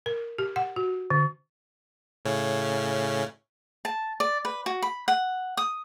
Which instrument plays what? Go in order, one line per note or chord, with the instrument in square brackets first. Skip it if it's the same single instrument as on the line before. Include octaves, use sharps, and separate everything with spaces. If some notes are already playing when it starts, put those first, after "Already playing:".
[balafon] A#4
G4
F#5
F#4
D3
[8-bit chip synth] A2 C#3 C#4
[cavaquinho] A5
D5
B4
F#4
B5
F#5
D#6